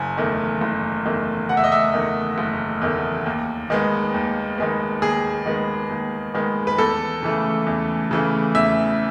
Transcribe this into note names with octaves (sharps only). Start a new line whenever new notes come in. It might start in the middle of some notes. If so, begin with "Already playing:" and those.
Already playing: F#1 G#5
E2 D#3 A3
F#1
E2 D#3 A3
F#1 F#5
E5
D#5
E5
E2 D#3 A3
F#1
E2 D#3 A3
D#2
D#3 G#3 B3
D#2
D#3 G#3 B3
D#2 G#4
D#3 G#3 B3
D#2
D#3 G#3 B3
B4
E2 A4
C#3 E3 A3
E2
C#3 E3 A3
E2 E5